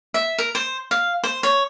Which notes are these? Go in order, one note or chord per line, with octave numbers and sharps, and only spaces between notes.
E5
A#4
C5
F5
C5
C#5